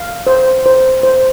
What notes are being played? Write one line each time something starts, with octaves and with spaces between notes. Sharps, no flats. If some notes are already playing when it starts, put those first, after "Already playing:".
Already playing: F5
C5
C5
C5